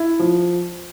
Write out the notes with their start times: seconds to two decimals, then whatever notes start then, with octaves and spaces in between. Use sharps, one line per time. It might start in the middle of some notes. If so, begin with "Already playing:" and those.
Already playing: E4
0.19 F3